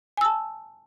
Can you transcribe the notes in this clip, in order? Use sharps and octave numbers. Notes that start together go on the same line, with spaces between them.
G#5 A5 E6